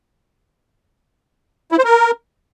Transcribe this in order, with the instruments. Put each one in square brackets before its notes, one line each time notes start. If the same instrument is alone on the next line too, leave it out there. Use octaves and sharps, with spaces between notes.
[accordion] E4
C5
A#4